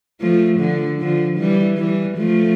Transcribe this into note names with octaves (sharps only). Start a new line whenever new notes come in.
F3 A3
D3 F3
D3 F3
E3 G3
E3 G3
F3 A3